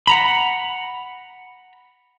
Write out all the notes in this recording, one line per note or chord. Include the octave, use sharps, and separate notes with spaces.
F#5 A#5 B5